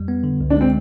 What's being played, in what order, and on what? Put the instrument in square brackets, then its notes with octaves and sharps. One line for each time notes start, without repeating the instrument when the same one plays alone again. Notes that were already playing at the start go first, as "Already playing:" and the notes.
Already playing: [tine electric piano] F2 G3
B3
D3
C#2
[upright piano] D4
[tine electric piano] G#3 [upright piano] C4